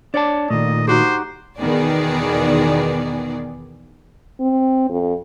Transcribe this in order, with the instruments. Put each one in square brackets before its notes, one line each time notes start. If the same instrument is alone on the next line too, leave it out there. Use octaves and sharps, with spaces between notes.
[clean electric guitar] D4 C#5 A5 [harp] D5
[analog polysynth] A#2 [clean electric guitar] D#3 A3 [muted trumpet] D#5
[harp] D#4 F#4 G4 [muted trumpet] C5
[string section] E2 B2 D#3 B3 G#4 D5
[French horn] C4
F2